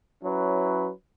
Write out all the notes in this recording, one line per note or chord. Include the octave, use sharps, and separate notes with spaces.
F#3 C#4 E4 B4